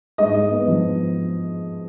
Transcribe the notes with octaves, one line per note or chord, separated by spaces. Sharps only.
G#2 D#5
G#2
B3
F3